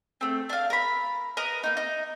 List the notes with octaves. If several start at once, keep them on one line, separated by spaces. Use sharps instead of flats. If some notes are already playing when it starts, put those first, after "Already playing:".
A3 C4
D4 F5
A#4 B5
A#4 B4 D#5
A#3 D#4
D#4